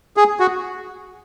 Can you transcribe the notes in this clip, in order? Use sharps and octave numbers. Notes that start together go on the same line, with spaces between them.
G#4
F#4